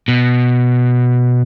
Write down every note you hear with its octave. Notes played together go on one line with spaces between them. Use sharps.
B2